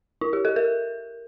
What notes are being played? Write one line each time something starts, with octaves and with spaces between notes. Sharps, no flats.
E4
G4
A4
A#4